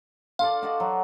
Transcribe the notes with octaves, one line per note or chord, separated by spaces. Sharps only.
F4 A4 D5 F5
F#4 D5 D#5
F#3